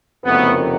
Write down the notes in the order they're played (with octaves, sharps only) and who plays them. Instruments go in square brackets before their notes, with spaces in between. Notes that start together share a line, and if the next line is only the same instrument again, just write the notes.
[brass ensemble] F#1 F2 C3 D#3 F#3 A3 B3